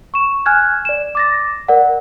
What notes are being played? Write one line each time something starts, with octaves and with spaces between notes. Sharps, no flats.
C#6 E7
G#5 F6 F#6 G#6
D5 E7
D6 A6 A#6
A#4 D5 F#5